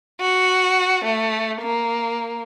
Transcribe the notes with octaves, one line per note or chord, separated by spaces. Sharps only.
F#4
A3
A#3